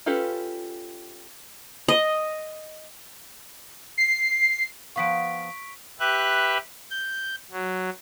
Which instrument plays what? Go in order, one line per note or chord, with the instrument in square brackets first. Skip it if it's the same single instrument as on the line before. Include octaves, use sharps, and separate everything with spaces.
[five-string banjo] C#4 F4 G4 A4 B4
[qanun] D#5
[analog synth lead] C7
[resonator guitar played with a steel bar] F3 B3 F5 [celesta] C#6 B6 D7
[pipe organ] G4 B4 E5 F#6
G6
F#3